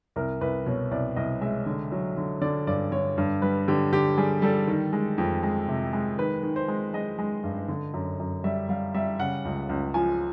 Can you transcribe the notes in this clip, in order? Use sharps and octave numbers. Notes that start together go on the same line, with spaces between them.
C2 A#4
C2 B4
B2 C#5
C2 D5
C2 D#5
G#3 E5
D3
F#3
D3
D3 D5
G2 D5
D3 C#5
G2
G3 B4
D3 G4
D3 G4
G3 G#4
G3 A4
D#3
G#3
F2
G#3
C3
G#3
D#3 B4
D#3
C5
G#3
G#3 D#5
G#3
G2
D3
F#2
F#2
G3 E5
G3 F5
G3 E5
C#3 F#5
C#2
C#2
F3 G#5